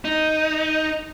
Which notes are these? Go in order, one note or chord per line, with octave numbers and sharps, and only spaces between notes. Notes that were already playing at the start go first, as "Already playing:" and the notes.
D#4